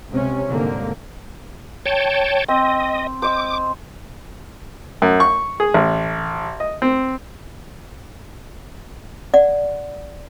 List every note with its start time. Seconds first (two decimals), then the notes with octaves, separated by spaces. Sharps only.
0.11 C#2 C3 C#4
0.48 C2 G#2 D3 A#3
1.86 C#5 G5 A5
2.48 C4 D#5
3.22 C5 D#5 D6 E6
5.02 F#2
5.20 C#6
5.60 G#4
5.74 A1
6.60 D#5
6.82 C4
9.34 D5 F#5